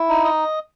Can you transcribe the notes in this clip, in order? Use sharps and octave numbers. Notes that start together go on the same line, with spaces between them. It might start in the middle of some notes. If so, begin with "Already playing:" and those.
Already playing: E4
D#4
D#5